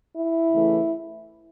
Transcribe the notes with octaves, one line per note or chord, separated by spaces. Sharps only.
E4
C#3 E3 A3